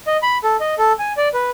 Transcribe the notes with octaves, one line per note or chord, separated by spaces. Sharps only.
D#5
B5
A4
D#5
A4
G#5
D5
B4